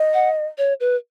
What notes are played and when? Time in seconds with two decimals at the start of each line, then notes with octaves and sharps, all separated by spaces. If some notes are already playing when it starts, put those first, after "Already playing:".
Already playing: D#5
0.14 F#5
0.58 C#5
0.80 B4